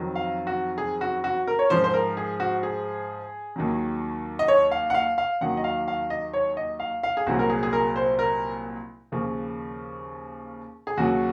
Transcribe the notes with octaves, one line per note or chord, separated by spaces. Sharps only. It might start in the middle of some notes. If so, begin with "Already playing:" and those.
Already playing: F2 D#3 F#3
F5
F#4
G#4
F#4
F#4
A#4
C#5
G#2 F3 C5
C5
A#4
G#4
F#4
G#4
D#2 D#3 F#3
D#5
C#5
F5
F#5
F5
F5
D#2 D#3 F#3 F#5
D#5
F5
F5
D#5
C#5
D#5
F5
F5
G#4
C2 A#2 F#3 F#4
A#4
G#4
G#4
A#4
C5
A#4
D#2 C#3 F3
G#4
D#2 C#3 F#3 F#4